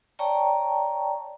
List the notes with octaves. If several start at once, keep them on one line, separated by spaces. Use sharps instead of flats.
C#5 D5 G5 A5 A#5 C#6